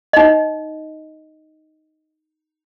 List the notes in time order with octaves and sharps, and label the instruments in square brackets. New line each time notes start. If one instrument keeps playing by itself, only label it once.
[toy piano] D#4 D#5